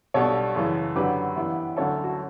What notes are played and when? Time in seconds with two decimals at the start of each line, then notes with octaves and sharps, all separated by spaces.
0.14 B1 B2 G3 D4 A4 C#5
0.55 F#2 C#3 E3
0.95 F#2 D3 F#3 G4 B4
1.36 G2 E3 B3 E4
1.76 D2 D3 F#3 C#4 E4 A4 C#5
2.04 F#4 A4